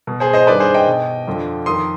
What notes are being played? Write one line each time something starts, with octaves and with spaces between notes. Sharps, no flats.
B2
G#4 C5
C5 D#5
G2 D#3 B4 D5
G#4 C5
D#5 G5
B2
F2 D3 F3
F2 D#3 C6 D#6